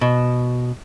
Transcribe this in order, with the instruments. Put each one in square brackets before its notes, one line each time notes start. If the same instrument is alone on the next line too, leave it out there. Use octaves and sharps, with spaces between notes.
[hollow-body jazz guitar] B2